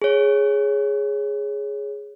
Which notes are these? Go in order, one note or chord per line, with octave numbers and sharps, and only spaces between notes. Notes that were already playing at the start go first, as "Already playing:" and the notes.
G#4 C#5